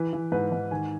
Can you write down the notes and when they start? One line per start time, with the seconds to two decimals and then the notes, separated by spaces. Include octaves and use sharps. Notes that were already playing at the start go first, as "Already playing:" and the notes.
Already playing: E3 B4
0.13 E3
0.32 G#2 B4
0.52 G#2
0.71 D#3 G#5